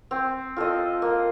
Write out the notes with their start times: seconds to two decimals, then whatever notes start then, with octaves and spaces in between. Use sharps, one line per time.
0.11 C4
0.57 F4 A4 D#5
1.02 A#3